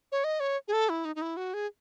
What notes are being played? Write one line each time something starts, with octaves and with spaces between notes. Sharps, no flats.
C#5
D#5
C#5
G#4
A4
E4
D#4
D#4
E4
F#4
G#4